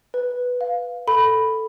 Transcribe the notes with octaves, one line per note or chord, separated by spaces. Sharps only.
B4
F5
A4 B5